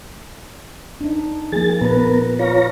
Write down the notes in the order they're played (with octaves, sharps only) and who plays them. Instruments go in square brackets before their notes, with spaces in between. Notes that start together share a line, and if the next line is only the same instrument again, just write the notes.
[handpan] D4 D#4
[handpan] F3 A#3 [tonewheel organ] G#4 A6
[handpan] A#2 B4 [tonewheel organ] B3 A#4
[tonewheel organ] F4 C#5 A#5